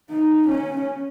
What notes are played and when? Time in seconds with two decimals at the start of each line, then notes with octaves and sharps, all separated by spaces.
0.10 D#4
0.48 C#4